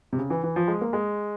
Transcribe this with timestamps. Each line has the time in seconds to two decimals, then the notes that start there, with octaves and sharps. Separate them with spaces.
0.13 C3
0.18 C#3
0.30 E3
0.44 E3
0.56 F3
0.68 G#3
0.81 A#3
0.93 G#3